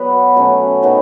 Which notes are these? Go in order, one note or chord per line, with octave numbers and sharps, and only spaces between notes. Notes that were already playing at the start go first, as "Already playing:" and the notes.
Already playing: F#3 B3 F#4 B4
B2 F#3 A3 C#4
D#3 F#3 B3